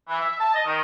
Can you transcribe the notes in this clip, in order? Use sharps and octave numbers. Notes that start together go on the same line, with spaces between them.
E3
E5
A5
D#5
D#3